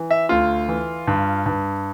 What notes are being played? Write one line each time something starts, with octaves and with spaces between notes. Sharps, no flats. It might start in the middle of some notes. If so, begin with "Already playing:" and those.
Already playing: E3
E5
D2 F4
E3
G2
G2